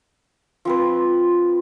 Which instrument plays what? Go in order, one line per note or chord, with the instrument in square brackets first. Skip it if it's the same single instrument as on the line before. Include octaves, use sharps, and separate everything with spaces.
[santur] F3 C4 B4